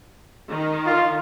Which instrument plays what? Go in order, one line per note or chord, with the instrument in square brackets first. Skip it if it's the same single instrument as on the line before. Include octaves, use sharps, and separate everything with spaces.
[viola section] D#3
[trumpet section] F4